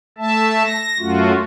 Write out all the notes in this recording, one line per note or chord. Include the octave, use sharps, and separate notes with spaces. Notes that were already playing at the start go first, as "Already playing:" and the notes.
A3 E5 A5
A#6
F#2 A3 F4 F#4